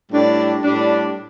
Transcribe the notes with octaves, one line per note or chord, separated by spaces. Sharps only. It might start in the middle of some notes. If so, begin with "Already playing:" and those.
A2 G3 D4
A2 G3 D4